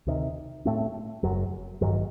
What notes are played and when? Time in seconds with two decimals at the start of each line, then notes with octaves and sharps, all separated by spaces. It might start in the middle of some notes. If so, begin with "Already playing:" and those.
0.07 D2 C3 D#3
0.65 A2 A3 C4
1.23 F#1 F#2 F#3
1.81 A1 G2 D#3 F#3